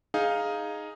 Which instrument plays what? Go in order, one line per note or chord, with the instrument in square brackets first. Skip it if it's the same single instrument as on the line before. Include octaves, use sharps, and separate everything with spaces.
[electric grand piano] D#4 G#4 F5